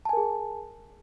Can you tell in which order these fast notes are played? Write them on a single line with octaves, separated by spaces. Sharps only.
A5 G#5 A#4 G#4